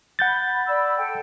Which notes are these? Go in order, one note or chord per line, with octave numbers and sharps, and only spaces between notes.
F#5 B5 G6 A6
D5 B5 E6
A4 G5